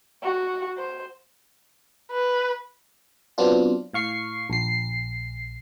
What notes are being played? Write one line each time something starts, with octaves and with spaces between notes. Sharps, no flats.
F#4
C5
B4
F#3 B3 C4 D4 F4
A2 F5 C#6 C7
A#1 C7